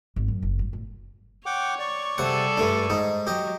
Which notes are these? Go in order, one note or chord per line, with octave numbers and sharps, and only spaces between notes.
G#1
F#2
F#1
G2
A2
C#5 F#5 G5 D6
D5 C#6
C3 G3 G#4 A4 F#5
G2 A3 D4
G#2 D#4
F#3 G4 D#5